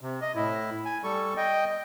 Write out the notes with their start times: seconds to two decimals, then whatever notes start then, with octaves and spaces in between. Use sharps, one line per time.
0.01 C3
0.22 D#5
0.35 A2 E4
0.85 G#5
1.04 G3 A4 C#6
1.37 D#5 G5